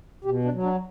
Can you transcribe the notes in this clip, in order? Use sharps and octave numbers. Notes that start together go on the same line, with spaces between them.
B2 G4
D4
F#3
D4